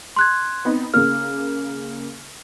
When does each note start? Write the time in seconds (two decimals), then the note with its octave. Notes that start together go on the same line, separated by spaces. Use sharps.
0.16 C6 F#6 G#6
0.65 B3 C4 D#4
0.94 C#3 A#3 F6